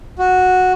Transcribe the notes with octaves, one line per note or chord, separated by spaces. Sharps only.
F#4